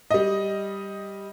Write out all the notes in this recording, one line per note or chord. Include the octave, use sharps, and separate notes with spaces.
G3 D#5